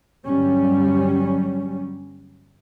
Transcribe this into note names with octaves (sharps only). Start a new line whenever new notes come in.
G1 F#3 G3 C#4